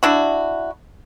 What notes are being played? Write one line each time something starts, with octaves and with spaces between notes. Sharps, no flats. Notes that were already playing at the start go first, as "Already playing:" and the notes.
D4 E4 F#4